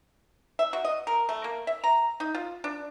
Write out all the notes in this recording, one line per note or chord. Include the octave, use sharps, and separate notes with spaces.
E5
F#4
D#5
A#4
A3
A#3
E5
A#5
D#4
F4
D4